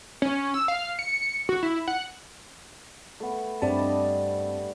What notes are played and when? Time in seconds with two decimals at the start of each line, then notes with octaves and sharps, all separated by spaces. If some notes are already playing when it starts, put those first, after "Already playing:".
0.22 C#4
0.54 E6
0.68 F5
0.99 C#7
1.49 F#4
1.63 E4
1.88 F#5
3.20 A3 B3
3.62 G2 G3 A3 C4 D4 A5
3.79 D#5